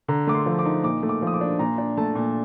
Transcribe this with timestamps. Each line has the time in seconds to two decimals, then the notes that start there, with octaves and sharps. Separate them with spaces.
0.08 D3 A#5
0.27 A3 D6
0.34 C6
0.46 F3
0.59 D6
0.65 D#4
0.84 A#2 D6
1.03 A3
1.09 D6
1.22 F3
1.27 D#6
1.34 D6
1.41 D4
1.59 A#2 A#5
1.78 D4
1.97 A3 A5
2.15 A#2